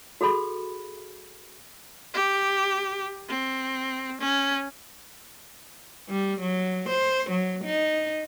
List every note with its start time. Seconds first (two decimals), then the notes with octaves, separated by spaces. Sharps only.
0.21 F#4 G#4 A4 B5
2.14 G4
3.28 C4
4.20 C#4
6.10 G3
6.41 F#3
6.90 C5
7.31 F#3
7.65 D#4